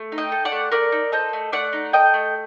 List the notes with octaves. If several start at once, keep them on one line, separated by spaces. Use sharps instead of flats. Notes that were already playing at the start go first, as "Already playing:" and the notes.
Already playing: A3
D#4
D#5 G5
A4
D5 F#5
A3
A3 A#4 D5
D#4
A4 C5 D#5
A3
A3 D5 F#5
D#4
A4 D#5 G5
A3